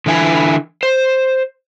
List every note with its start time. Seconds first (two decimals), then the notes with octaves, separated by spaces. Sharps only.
0.06 D3 E3 E4 D#5 G#5
0.83 C5